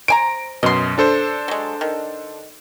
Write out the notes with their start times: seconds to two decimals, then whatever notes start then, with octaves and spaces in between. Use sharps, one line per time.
0.08 C5 G#5 A#5 D7
0.63 F#2 B2 D#5 C6
0.98 D4 A4 C5
1.48 F#3 G#3
1.81 D#3